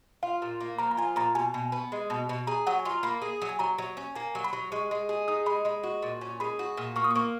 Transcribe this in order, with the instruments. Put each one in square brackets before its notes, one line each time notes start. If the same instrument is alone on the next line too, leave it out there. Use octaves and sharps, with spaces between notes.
[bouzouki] F4 [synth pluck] F5
[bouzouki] A#2
A#3
[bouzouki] F3 [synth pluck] A#5
[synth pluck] A#5
[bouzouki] F4 [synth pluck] G#5
[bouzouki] A#2 [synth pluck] A#5
[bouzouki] B2 [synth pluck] G#5
[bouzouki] B2
B3
G#3
B2
B2
[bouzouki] G#4 [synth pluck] A#5
[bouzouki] F#3 [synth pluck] F#5
[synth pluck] G#5
[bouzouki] F4
[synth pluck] A#5
[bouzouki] A#3 [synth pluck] B5
[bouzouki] G#4
F#3
[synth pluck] G#5
[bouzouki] F#3 [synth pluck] A#5
[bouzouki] F#3
C#4
[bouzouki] A#3 [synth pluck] G#5
[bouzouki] F#3
[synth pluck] B5
[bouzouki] F#3
[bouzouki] G#3 [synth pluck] C#6
[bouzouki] G#3
G#4
[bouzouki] D#4 [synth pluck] D#6
[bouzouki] G#3 [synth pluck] B5
[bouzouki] G#3 [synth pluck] B5
[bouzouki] F#4
A#2
C#4
[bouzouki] G#3 [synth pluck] B5
[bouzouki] F#4
A#2
[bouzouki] A#3 [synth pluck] C#6
[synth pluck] D#6
[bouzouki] A#3 [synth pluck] C#6